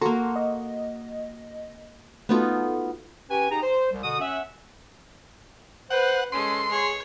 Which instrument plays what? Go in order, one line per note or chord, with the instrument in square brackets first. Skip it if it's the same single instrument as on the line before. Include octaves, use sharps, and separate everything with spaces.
[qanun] A#3 F#4 [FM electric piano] A4 A#5 C6
[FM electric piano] D#5
[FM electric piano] A3 F#4 A4 [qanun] B3 D#4 F4
[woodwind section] C#4 G4 B4 G#5
D#4 G4 G#4 A#5
C5
C2
B2 D3 F#4 D#6
C#4 E5 F#5
[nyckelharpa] B4 [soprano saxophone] C5 [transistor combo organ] F#5
[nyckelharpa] G#3 A4 [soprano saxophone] C#4 [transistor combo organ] C6
[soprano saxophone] G#4 [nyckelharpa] C#5